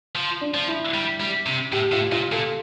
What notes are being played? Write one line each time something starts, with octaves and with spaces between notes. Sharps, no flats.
F3
D4
F3
E4
G3
G3
C3
A2 G4
A2 F4
A#2 F4
A#2 A4